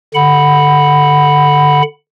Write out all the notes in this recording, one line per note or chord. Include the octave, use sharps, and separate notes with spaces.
D3 F#5 B5